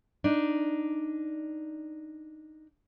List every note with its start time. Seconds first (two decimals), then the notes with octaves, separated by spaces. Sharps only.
0.24 D4 D#4